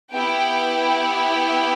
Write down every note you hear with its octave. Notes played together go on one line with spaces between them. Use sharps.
B3 E4 G4 G5